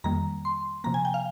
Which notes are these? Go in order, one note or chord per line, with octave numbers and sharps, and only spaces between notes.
F2 D#3 G3 A#3 A#5
C6
C3 F3 A#3 A#5
G#5
G5
F5